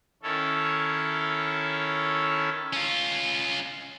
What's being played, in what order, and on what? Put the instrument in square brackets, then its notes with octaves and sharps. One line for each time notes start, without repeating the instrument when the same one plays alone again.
[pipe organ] D#3 C#4 E4 A4 C#5
[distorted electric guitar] C#4 F4